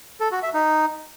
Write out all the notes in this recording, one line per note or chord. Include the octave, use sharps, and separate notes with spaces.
A4
F#4
E5
D#4